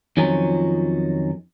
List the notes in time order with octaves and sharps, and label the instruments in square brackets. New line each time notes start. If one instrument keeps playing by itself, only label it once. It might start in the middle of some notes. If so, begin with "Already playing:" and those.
[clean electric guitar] F2 D#3 F3 F#3 C#4